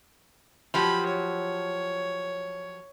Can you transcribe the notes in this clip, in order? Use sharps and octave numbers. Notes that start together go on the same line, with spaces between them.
F3 F#3 G4 B5
C#5